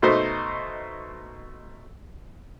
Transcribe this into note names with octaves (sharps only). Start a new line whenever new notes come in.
B2 A3 D#4 C5